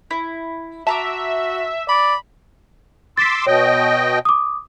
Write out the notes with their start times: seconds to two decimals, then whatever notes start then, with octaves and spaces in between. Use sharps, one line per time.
0.11 E4
0.87 F#4 E5 A5 A#5 D6
1.89 D5 B5
3.17 C6 D6 E6 A6 B6
3.47 B2 C#5 D#5 G5
4.25 D6 D#6